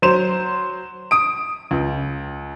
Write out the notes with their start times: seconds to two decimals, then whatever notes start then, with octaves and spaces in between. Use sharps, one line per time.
0.02 F#3 C5 E7
1.11 D#6 D7
1.71 C#2